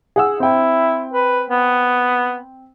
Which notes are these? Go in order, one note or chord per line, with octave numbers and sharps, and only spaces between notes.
G#4 F#5 E6
C4 E4 G5
B4
B3